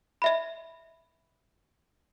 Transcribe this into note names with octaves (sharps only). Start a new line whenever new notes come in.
D#5 E5 B5